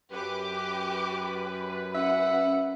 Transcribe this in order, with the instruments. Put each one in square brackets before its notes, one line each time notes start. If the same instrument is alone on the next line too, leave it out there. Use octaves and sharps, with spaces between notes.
[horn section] F#2 B4 [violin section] G4 D6
[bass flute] C#4 [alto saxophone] E5 [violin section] F#5